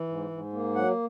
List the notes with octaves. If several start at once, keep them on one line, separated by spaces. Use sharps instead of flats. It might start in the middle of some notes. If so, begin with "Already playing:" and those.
Already playing: E3
G#2
G#2
A#3
F#3 F#5